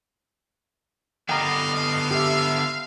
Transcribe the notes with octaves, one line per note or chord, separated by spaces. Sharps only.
D3 B3 D#5 F5 G5 A#5
G4 E5